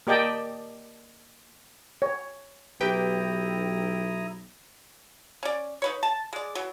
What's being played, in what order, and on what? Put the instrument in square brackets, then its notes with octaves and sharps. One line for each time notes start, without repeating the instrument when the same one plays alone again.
[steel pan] A#3 G4 D5 D#5 G5 A5
C#5
[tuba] B1 [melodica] E4 A#5 D#6 [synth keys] G4 B4 G5
[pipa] C#4 D5
D#4 B4 C#5
A5
G#3 D5
E3 F#3